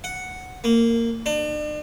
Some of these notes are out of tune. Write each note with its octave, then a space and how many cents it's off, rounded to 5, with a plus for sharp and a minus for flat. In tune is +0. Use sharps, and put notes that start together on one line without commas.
F#5 +0
A#3 -15
D4 +40